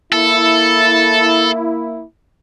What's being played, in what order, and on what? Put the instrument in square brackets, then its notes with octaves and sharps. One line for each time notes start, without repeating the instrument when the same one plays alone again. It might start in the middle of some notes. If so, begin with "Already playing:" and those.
[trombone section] A#3 E4 [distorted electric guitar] A4